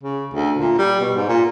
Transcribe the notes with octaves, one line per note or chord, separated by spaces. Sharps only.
C#3
D2
A#2
G3
B2
G#2
A#2